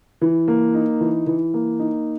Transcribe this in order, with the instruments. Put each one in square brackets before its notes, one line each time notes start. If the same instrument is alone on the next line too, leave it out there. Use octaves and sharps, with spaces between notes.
[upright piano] E3
A#3
D#4
E3
E3
A#3
D#4